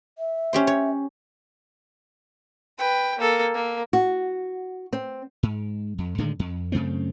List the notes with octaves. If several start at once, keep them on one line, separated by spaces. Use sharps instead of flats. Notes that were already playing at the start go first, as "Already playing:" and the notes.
E5
C#4 G4 C5
C#5
B4 G5
A#3 A4
A#3
F#4
C4
G#2
F2
A2 D3 D#3 G#3
F2
F#2 C#3 A3 C4